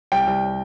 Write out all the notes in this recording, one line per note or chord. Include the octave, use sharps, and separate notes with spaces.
C2 G5
C2